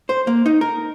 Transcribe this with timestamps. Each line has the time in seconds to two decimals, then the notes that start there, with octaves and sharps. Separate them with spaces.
0.09 C5
0.27 A#3
0.46 D#4
0.61 A#4